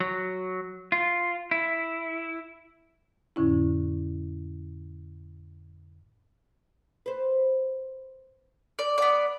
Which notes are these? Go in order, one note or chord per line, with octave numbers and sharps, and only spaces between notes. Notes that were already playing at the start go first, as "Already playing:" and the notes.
F#3
F4
E4
F2 A2 D3 C#4 E4
B4 C5
D5
B3 D5